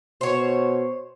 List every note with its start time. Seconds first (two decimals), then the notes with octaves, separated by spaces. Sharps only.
0.21 B2 C5 C#5